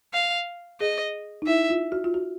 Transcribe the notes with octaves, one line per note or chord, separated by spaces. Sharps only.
F5
G#4 D#5
D#4
E4 E5
F4
F#4
F4
F#4